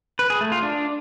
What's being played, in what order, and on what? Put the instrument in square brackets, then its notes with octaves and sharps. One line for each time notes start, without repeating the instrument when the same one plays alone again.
[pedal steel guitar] B4
G#4
A3
F4
D4